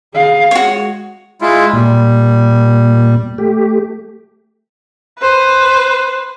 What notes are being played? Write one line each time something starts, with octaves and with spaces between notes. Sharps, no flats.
G#4 F5
G#3 F#4 C#5
G#3 E4 F4
A#2 G3
A3 G4
B4 C5